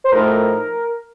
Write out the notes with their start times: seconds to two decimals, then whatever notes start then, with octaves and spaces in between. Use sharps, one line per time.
0.04 C5
0.12 A2 F3 A3 D#4 A#4